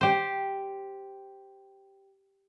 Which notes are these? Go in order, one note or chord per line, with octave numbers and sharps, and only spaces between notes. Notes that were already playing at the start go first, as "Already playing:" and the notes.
G4 C5